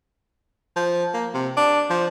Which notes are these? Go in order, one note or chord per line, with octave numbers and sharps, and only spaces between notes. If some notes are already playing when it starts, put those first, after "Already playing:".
F3
A#3
C3
D4
F3